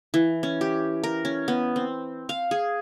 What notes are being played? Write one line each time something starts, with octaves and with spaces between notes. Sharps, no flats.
E3
C#4
G4
A#4
C#4
B3
C4
F5
G#4